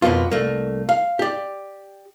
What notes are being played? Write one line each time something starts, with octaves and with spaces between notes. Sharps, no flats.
F2 B2 A#3 B3 F4
C2 A3 A#3
F5
G4 D5